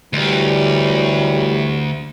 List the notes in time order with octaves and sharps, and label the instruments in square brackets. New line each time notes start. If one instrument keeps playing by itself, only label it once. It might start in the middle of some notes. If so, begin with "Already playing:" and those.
[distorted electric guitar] D2 [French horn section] E3 F#3 G3